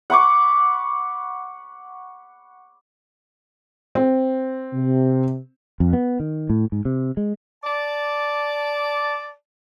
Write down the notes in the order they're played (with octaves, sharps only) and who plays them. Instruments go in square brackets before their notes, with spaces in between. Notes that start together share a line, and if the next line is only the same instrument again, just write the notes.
[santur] F#5 B5 C#6 D6
[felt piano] C4
[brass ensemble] C3
[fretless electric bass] F2
B3
D#3
A2
G#2
C3
G#3
[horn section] D5 A5